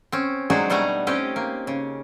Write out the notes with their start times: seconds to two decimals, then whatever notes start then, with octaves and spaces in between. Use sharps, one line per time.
0.12 C4 C#4
0.50 F#3 G#3 D4 D#4 F#4 G#4
0.70 B2 G3 A3 F#5 G#5 A#5
1.07 C4 C#4 G4 D#5
1.36 A#3
1.67 C#3